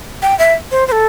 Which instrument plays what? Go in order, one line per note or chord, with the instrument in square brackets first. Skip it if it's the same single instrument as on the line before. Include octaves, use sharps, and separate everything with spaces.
[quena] G5
E5
C5
C5
A4